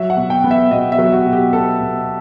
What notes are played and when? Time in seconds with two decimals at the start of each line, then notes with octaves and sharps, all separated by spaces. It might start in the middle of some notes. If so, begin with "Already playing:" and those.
Already playing: F#3 E5
0.10 F#5
0.17 B2
0.30 G5
0.44 B3
0.51 E5
0.71 B2 D#5
0.92 E5
0.98 F#3
1.12 F#4
1.26 B2
1.33 G4
1.53 B3 A4
1.80 B2